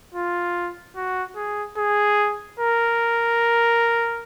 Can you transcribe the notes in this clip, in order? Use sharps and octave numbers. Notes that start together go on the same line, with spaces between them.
F4
F#4
G#4
G#4
A#4